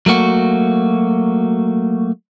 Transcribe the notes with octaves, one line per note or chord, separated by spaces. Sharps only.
F#3 A3 A#3 F#4